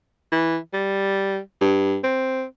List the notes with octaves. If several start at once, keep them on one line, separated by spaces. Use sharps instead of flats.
E3
G3
G2
C4